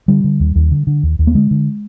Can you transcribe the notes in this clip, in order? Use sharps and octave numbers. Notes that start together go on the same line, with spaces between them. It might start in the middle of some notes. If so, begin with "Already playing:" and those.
D3 G3
D3
D#2
D#2
D3
D3
D#2
D#2
A#3
D3 G#3
D3